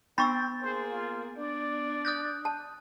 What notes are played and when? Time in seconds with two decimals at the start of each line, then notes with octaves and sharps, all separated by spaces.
0.18 B3 C4 B5 C#6 E6 G6 A6
0.62 A#3 G#4 C5
0.91 F4
1.37 D4 D5
2.05 D#6 F#6 G6
2.45 A5